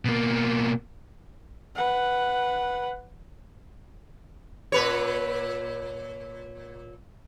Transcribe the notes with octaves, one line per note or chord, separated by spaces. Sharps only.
B2 A#3
B4 F#5
A#2 B4 C#5